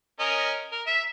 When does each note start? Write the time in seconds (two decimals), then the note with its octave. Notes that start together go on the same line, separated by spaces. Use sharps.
0.19 C#4 A#4 D#5
0.72 A#4
0.87 E5